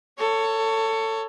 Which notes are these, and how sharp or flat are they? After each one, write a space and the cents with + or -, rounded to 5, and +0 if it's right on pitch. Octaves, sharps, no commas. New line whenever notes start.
A4 +25 C#5 +10